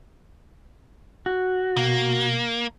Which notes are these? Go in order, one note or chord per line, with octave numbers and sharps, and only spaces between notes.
F#4
B2 A#3